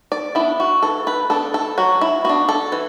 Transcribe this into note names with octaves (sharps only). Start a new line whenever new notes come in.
D5
B3 D4 E4
F#4
E3 A4
B4
B3 D4 A4
A4
F#3 F#4
E4
B3 D4 F#4
A4
E3